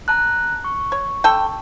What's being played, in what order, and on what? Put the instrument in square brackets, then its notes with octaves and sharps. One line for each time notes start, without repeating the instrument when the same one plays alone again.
[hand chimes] A5 A#5 F#6
C#6
[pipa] C#5
D3 A4 G5